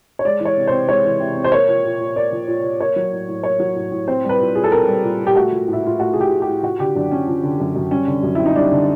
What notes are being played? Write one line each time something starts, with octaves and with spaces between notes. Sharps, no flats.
C#5
G#3 D5
E3
C#5
C3
C4 C5
G#3 C#5
E3
C3
C4
C5
A#3 C#5
F3
A#2
A#2
A#3 D5
F3
A#2
A#2
A#3 C#5
F#3
A2
A2
A#3 C#5
F#3
A2
A2
C4 C5
G3 B4
A#2
A#2 G#4
A4
C4 A#4
G3
A#2
A#2
G4
A3 F#4
F3
A2 E4
A2 F4
A3 F#4
F3 G#4
G4
A2
G4
A2
F3 F#4
D3 G4
F#2 D4
F#2 C#4
F3
D3
F#2
F#2
G3 C#4
D3
F#2
C4 E4
D#4
G3 D4
D3